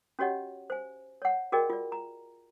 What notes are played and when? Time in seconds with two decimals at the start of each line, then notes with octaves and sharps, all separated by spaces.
0.19 C#4 F#4 G4 C#5 D#5 F#5
0.70 C5 G#5
1.22 C#5 F#5
1.52 F#4 G#4 A#4 D5 D#5 G5
1.70 F4 D5
1.92 A#5